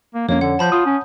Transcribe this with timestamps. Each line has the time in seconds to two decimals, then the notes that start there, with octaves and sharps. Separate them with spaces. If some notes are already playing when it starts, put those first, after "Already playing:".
0.15 A#3
0.29 F2 A#3 C#4 C#5
0.41 D3 F#5
0.59 F3 A5 B5 G6
0.72 F4 D#6
0.86 C#4